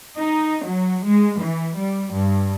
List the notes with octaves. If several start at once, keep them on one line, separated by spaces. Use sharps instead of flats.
D#4
F#3
G#3
E3
G3
G2